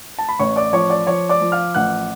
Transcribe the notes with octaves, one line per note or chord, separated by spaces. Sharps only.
A5
B5
A1 C#5 C#6
D5 D6
F3 C#5 C#6
D5 D6
F3 C#5 C#6
D5 D6
F3
F5 F6
A1 F#5 F#6